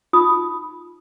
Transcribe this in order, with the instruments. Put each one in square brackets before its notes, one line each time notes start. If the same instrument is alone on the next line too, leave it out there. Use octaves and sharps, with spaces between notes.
[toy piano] D#4 F4 B5 D#6